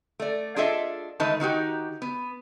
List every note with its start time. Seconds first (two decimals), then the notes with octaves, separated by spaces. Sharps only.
0.20 A3 D5
0.56 D4 F4 G#4 A4 D#5 E5
1.20 D#3 G#3 A3 D#4 B4 A5
1.40 D#3 D#4 F#4 G4
2.02 B3